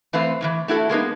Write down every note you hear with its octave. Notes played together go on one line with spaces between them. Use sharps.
E3 A3 C4 B4 C5 F5
A2 D#3 E3
A3 E4 F#4 A4
G#3 A#3 B3 D#4